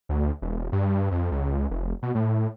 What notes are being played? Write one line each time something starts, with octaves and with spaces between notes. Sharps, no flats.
D2
E1
G2
F2
C#2
F1
B2
A2